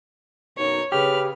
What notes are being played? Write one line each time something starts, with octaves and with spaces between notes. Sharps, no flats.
F#2 B2 D#4 C#5
C#3 G4 B4 F6